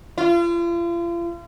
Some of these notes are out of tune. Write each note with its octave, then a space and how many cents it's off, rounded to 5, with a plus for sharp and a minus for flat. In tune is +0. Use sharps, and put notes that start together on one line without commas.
F4 -40